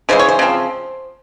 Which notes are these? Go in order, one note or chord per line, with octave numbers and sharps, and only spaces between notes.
C#3 E3 G#3 C5
C#5
C5
C#3 F3 C4